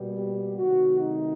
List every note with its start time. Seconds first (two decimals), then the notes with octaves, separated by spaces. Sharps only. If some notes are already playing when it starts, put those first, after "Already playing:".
Already playing: B2 G3 A#3
0.17 G4
0.57 C3 D#3 F#3 A3 C4 F#4
0.99 D#4